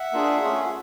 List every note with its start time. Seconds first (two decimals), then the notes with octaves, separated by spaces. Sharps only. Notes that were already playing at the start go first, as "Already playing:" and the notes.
Already playing: E5 F#5
0.13 A#3 D4 F4 G#4
0.43 A3 C#4 F4 G#4
0.64 F#5